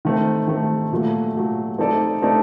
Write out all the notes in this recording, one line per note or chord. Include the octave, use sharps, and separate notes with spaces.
D#3 A3 C4
D#3 A3 C4
A#2 F#3 A3
A#2 F#3 A3
A3 C4 D#4 A4 D5
A3 C4 D#4 A4 D5